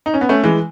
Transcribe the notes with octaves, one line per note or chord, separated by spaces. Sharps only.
D#4
C#4
B3
A3 C#4
E3 G#3